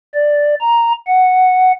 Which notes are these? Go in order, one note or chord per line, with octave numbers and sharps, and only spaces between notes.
D5
A#5
F#5